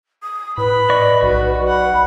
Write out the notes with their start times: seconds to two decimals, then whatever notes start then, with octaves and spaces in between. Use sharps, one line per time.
0.23 D#6
0.58 A2 B4 B5
0.90 D5 D#5 C#6
1.23 B1 F#4
1.68 F#5 B5